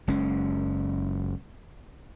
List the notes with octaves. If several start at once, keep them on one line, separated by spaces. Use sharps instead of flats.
F#1 G#3 C#4